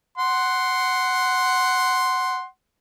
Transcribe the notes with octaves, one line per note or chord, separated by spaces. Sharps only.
F#5 C6